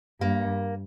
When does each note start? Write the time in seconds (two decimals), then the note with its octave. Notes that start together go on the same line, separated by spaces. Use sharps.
0.20 G2 A#3